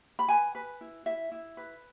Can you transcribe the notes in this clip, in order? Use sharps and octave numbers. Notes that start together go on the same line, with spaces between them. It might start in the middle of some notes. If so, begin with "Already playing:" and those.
B5
B4 G#5
B4
E4
E4 E5
E4
B4